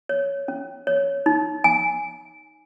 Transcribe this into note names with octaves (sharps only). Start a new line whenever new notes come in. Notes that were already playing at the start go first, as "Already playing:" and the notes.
C#5
C#4
C#5
D#4
G#5